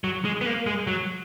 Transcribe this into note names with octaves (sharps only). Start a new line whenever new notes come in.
F#3
G#3
B3
A#3
G#3
F#3